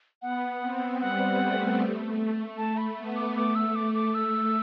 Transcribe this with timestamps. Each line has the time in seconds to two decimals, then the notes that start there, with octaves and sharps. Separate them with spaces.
0.21 B3 F#5
0.61 C4
1.00 G3 F#5
1.39 A3
2.58 A3 A5
2.78 B5
2.97 B3
3.16 D6
3.36 A3 D6
3.55 E6
3.76 D6
3.95 D6
4.14 E6